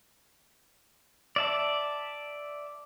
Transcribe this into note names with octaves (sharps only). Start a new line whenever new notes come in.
D5 E5 A5